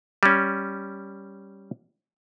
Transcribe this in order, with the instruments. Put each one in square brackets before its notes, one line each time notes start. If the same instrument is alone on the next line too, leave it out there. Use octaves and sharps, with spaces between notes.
[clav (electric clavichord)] G3 C#4